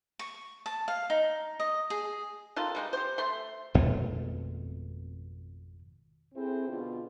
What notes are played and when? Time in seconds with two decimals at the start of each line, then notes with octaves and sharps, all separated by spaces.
0.19 C#6
0.66 A5
0.88 F5
1.10 D#4
1.60 D#5
1.90 G#4
2.56 D#3 F4 A4
2.75 G3 G#3 D#4
2.93 G4 C5
3.18 A3 C6
3.74 G#1 F2 B2 A3
6.35 C4 E4 G#4 A4 C5
6.68 B2 D3 F4